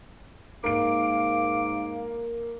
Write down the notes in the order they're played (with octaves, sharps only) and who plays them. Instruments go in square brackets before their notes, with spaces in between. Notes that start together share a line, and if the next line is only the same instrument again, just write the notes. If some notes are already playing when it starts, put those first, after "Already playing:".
[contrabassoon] G#2 [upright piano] A#3 D7 [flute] F5 [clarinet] D6